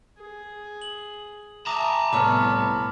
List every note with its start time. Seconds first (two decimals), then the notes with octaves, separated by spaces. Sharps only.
0.18 G#4
0.82 F#7
1.67 E5 A5 A#5 D6 D#6 A#6
2.13 C2 A2 B3 B5 D6 E6 F6